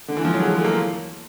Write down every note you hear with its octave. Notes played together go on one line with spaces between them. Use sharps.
D3
E3
F3
F#3
G#3
G#3
A3
A#3